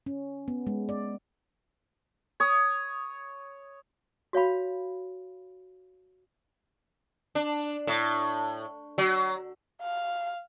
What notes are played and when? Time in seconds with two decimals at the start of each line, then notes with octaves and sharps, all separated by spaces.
0.06 C#4
0.48 B3
0.67 G#3
0.89 D5
2.40 C#5 D#6
4.33 F#4 C#5 F5 B5
7.35 D4
7.87 A2
8.98 F#3
9.82 F5